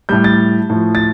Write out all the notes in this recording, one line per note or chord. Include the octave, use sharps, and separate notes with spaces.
A2 G3 G6
A6
A2 F3
A6